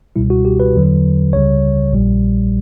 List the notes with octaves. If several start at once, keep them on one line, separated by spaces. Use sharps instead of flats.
C#2 B2 G3 E4
F#4
G4
B4
E2 D3 F#3
C#2 C#3 G3 C#5
A#1 A#2 G3